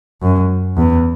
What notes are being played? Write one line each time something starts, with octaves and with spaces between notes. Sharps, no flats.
F#2
E2